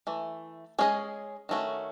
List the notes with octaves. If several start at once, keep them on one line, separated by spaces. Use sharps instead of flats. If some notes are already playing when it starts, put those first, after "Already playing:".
E3 A3
G#3 C#4 G#4 B4 D#5
D#3 A3 C#4 F#4